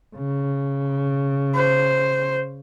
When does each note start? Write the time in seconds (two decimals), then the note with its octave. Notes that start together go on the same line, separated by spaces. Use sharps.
0.16 C#3
1.54 C5